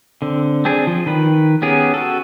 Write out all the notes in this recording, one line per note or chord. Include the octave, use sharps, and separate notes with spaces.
D3 C4
C4 D4 G#4
F3
D#3 B4
B3 C#4 G4 G#4 A#4
F#4 A4